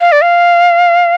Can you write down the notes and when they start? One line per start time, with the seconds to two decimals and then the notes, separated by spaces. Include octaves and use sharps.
0.01 F5
0.12 D5
0.23 F5